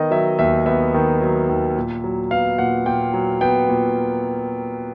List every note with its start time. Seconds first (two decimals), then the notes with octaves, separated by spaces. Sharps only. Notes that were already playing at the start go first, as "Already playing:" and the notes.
Already playing: D#3 B3 D#5
0.11 F#3 E5
0.39 D#2 E5
0.66 B3 E5
0.94 D#3
1.21 F#3
1.49 D#2
1.76 A#2
2.04 F#3
2.31 B3 F5
2.58 A#2 F#5
2.86 A#2 G5
3.14 F#3
3.41 B3 G5
3.68 A#2